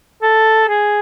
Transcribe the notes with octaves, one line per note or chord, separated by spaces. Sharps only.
A4
G#4